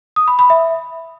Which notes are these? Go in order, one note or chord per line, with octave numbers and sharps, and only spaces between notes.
D#6
B5
B5
E5